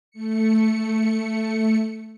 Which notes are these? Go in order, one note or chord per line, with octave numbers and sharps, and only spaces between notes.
A3 C#7